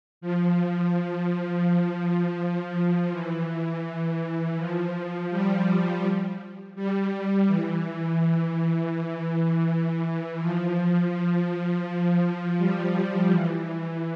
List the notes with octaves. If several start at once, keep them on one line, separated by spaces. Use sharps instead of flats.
F3
F3
E3
F3
G3
G3
E3
E3
F3
F3
G3
E3